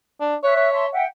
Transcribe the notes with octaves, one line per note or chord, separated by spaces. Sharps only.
D4
C#5 E5 F#6
C#5
E5 A5 C6
E5 F#5 G5